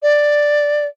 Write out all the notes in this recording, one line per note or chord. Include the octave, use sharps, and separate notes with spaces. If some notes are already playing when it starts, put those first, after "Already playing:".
D5